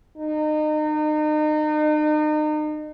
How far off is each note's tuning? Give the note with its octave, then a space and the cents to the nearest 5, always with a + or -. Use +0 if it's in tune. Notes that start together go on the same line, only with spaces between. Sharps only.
D#4 -35